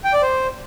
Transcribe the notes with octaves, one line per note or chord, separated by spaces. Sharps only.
G5
D5
C5